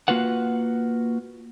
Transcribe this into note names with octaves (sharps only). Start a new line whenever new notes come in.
A#3 F4 F#4 B4 F#5